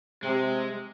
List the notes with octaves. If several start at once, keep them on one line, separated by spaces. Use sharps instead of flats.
C3 G#3